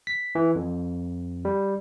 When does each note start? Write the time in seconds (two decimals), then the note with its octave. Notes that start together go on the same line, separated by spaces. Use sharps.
0.07 B6
0.35 E3
0.55 F2
1.45 G3